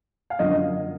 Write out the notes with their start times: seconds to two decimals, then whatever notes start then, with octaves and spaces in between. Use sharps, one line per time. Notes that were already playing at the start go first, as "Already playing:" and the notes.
0.30 F5
0.39 F#2 D3 F#3 A#3 F4 D#5